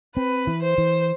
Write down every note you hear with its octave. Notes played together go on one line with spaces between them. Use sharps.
C4 B4
E3
C5
E3